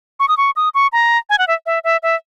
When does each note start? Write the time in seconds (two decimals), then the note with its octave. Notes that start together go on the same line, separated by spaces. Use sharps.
0.20 C#6
0.28 D#6
0.37 C#6
0.56 D#6
0.75 C#6
0.93 A#5
1.30 G#5
1.39 F#5
1.48 E5
1.66 E5
1.84 E5
2.03 E5